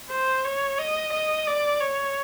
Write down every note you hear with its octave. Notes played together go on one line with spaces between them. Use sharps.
C5
C#5
D#5
D#5
D5
C#5